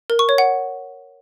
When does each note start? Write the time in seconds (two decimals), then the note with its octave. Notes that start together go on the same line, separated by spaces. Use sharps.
0.10 A#4
0.19 C#6
0.29 C#5
0.38 F#5